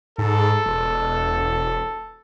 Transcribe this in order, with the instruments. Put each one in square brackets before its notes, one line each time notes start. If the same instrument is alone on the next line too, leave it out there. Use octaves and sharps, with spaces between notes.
[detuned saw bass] G#2 [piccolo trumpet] A4
[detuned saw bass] E1